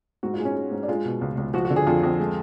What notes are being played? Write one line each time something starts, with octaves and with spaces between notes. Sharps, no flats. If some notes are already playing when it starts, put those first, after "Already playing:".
G#2 F#4
F4
G#3
C#4
G#3
G#2
D4
G#3 F4
B2
C#2
C#2
F3 F#4
F#4
D3
G#4
F2 F4
F2
G#3